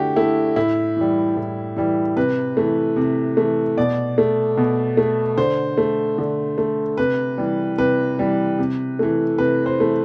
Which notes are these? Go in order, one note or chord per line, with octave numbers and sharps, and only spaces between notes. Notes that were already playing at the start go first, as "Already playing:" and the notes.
Already playing: D3 A3 E4 F#4 G4
A3 E4
A2 E4
E3 G3
A2
E3 G3
C3 B4
E3 A3
C3
E3 A3
B2 D5
A3
B2
A3
D3 C5
A3
D3
A3
C3 B4
E3 G3
C3 B4
E3 G3
C3
E3 A3
C3 B4
C5
E3 A3